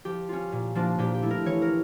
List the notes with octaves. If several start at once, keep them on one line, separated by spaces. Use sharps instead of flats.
F3 G4
C#4 F4
A#2
F3 A#3 D4 F4
A#2 G4
G4
A3 E4
A#4
E3 C#5
A#4